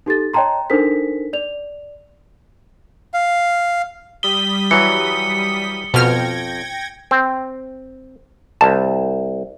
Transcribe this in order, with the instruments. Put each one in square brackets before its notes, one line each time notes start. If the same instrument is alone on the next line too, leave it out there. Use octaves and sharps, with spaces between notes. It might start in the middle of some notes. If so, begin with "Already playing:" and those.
[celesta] D#4 G4 A4 A6
C#5 D#5 G5 A5 A#5 C6
D4 D#4 A4 A#4 C5 B6
D5 F7
[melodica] F5
[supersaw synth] G3 D#6 B6 [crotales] G7
[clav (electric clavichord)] E3 F#3 [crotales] C#7
[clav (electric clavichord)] F2 [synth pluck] B2 F6 [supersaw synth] G5 G#6 A#6
[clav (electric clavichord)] C4
[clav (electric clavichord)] C2 [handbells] A5